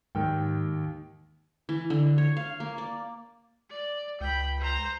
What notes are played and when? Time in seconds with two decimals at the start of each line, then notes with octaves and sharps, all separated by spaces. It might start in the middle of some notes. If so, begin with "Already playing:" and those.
0.15 D#2 G#2 D#3 G5
1.69 E3
1.90 D3
2.18 C#5
2.37 F5
2.60 A#3
2.78 D5
3.70 D5
4.21 C#2 G5 B5
4.60 C5 A#5